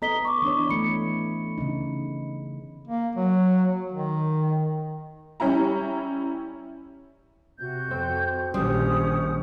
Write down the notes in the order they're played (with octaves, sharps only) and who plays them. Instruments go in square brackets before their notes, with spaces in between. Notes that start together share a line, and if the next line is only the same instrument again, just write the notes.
[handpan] B3 A4 D#5 [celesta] A#5 B6 G7
[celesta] C#6 D6
[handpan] E3 D4 C#5
[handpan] E3 A3 [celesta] B5 C#7
[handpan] C#3 D#4
[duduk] A#3
F#3
D#3
[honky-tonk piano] G3 C#4 E4 A#5
[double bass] C3 [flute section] F#4 G6
[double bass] F2 [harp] C4
[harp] D#1 C5 [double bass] A#1 [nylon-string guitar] G3 [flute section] C#4 D#6 G6